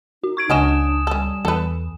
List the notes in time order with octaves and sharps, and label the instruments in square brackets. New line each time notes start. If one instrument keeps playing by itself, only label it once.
[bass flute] D#4 [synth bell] F#4
[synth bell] C#6 G#6 D7
[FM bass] C#2 [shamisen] F#3 C#4 D#5 [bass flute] D4 [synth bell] G#5 D#6 E7
[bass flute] G3 [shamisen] C#4 A4
[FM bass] E2 [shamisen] A4 B4